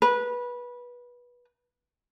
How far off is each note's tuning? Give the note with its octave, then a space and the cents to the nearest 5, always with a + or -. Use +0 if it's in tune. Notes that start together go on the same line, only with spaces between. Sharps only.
B4 -20